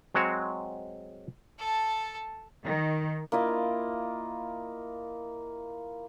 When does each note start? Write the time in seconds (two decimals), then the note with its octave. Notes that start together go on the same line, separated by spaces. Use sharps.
0.15 F#3 G#3 C4 F#4 C#5
1.59 A4 A5
2.64 D#3
3.32 A#3 E4 F4 D#5